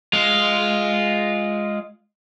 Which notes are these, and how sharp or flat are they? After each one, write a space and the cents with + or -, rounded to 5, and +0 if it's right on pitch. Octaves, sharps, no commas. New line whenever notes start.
G#3 +0 F4 +0